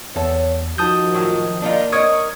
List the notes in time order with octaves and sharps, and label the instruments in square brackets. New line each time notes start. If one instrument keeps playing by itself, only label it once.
[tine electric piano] E2 [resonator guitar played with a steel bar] A4 [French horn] C#5
[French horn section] D#3 F3 [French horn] F#4 [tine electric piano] A5 D#6 G6
[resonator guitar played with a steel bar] A2 F#3
[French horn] A#3 [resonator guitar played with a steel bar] D4 D#4 F4
[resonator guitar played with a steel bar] A#4 C#5 D#5 [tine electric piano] C#6 D#6 G#6